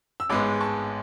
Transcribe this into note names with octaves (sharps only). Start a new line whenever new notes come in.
E6
A1 G#2 G#3 B3 B5 D6
A5 C#6